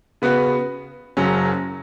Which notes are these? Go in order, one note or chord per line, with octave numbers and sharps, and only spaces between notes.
C#3 B3 F#4 B4
F#1 F#2 C#3 F#3 C#4